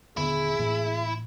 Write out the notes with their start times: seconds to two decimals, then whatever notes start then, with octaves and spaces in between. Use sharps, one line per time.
0.17 D#1 D3 B3 E4 G#4
0.59 A2 E3 A#3